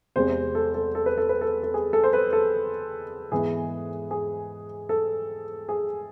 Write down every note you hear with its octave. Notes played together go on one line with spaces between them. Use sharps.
E2 C3 G#3 C5
A4
A4
A4
B4
A4
B4
A4
A4
G#4
A4
C5
B4
A4
G#2 E3 B3 G#4
G#4
A4
G#4